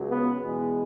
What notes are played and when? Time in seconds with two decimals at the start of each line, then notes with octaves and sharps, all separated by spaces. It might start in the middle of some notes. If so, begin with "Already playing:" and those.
Already playing: C#2 C#3 F#3
0.11 B3
0.41 E2 B2 G#3